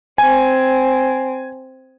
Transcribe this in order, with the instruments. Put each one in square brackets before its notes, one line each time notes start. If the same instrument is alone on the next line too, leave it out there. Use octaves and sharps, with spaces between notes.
[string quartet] C4 [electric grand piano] G#5